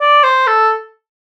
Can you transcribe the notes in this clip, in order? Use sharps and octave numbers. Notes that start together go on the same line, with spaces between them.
D5
C5
A4